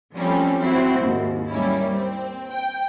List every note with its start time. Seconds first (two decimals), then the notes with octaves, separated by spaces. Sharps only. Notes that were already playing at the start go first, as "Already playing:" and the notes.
0.15 F3 G3 A3 C4 C#4
0.61 C4 E4 F#4 C5
0.98 D#2 G#2
1.51 G3 A#3 C#4 E4
1.91 C4
2.51 G5